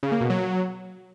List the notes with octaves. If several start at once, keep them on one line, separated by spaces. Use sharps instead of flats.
C#3
A#3
B2
F#3